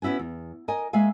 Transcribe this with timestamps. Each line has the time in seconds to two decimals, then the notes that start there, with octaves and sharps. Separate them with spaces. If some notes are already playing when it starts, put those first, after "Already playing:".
0.02 B3 C#4 E4 F#4 G#5
0.19 E2
0.68 A#4 D#5 G#5
0.93 G#3 A#3 E5 F5 G#5